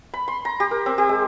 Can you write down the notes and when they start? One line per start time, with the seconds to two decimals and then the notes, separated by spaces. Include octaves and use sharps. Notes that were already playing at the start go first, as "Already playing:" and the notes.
0.14 B5
0.28 C6
0.45 A#5
0.60 G4
0.71 A#4
0.86 C4
0.98 G4
1.09 G#3